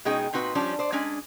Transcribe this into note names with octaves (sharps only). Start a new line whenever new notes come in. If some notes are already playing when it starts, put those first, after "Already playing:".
B2 G#3 C#4 D#4 G#4 G5
A#2 C4 D#4 F#4 B4
F3 G3 C#4 D4
C5 D5
G#3 C#4 D4 G#5